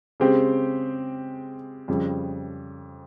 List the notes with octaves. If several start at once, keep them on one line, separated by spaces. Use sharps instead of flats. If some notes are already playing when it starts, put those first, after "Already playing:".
C#3 G#3 C4 G4
F2 C#3 G3